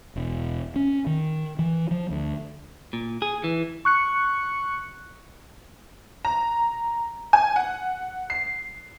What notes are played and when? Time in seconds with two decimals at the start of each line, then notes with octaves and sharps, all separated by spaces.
0.16 E1
0.76 C#4
1.07 D#3
1.59 E3
1.91 F3
2.10 D2
2.93 A#2
3.22 G#4
3.44 E3
3.85 C#6 F#6 C#7
6.25 A#5
7.33 G#5
7.56 F#5
8.30 C7